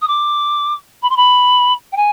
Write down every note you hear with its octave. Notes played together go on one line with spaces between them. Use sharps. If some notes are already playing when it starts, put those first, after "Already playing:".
D#6
D6
B5
C6
B5
G5
G#5